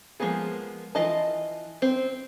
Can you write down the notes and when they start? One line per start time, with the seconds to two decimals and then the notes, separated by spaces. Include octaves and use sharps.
0.20 F3 G#3 A#3 B3 G#4
0.95 E3 F4 D#5 A5
1.82 C4